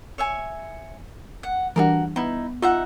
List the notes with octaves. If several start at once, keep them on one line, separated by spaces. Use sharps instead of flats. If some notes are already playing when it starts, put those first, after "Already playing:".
C#5 E5 G#5
F#5
E3 G3 D4 F#4 G#4 A#4
B3 D#4 E4
D#4 F4 E5 F#5